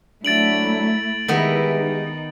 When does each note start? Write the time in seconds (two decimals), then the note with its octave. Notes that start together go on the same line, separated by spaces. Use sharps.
0.25 F#3 A3 D4 E4 A6 D7 F#7
1.28 D#3 E3 G3 G#3 B3 E4 A#4
1.75 D#4